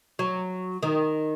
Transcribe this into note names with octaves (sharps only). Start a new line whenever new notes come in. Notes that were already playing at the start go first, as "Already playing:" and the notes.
F#3
D#3